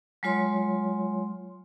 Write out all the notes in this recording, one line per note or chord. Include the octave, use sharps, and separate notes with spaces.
F#3 G#3 F4 C#5 C6